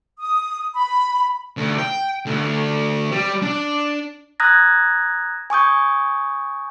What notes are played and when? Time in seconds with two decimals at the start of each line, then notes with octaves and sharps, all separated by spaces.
0.19 D#6
0.74 B5
1.57 D2
1.78 G5
2.26 D2
3.12 G3
3.42 D4
4.40 A#5 D#6 F6 F#6 G#6 A#6
5.50 G#5 C#6 D#6 G6